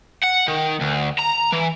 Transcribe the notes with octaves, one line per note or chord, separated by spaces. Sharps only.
F#5
D#3
D2
A#5
E3